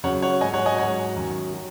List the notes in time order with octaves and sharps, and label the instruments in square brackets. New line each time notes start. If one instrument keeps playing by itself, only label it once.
[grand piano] F#2 C#3 F#3 C#5 F#5
C#5 F#5
G#2 F#3 D#5 G#5
C#5 F#5
D#5 G#5
G#2 F#3 C#5 F#5
F#2 D#3 F#3
F#3